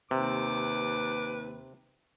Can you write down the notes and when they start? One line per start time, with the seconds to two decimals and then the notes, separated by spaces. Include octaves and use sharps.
0.11 D#2 C3 B4 D6